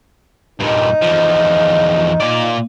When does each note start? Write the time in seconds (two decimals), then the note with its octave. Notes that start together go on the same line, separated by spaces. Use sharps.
0.60 G2 A#2 D#4
1.01 E2 F3
2.20 A#2 D5